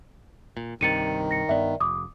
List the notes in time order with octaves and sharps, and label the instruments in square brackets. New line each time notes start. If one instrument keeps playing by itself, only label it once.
[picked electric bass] A#2
[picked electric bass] C2 G2 C3 [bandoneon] D#3 [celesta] A6 C#7 D#7
[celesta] A#6 C#7
[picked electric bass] G2 B3 [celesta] D5 E5
[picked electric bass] F1 [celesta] D6 D#6